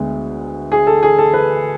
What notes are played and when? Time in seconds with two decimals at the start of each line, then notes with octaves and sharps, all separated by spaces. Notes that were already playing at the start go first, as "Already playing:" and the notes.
Already playing: D2 D3 G#3 B3
0.72 G#4
0.87 A4
1.03 G#4
1.19 A4
1.33 B4